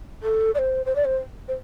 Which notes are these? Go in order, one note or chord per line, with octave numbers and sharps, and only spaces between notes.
A4
D5
C5
C5
D5
C5
C5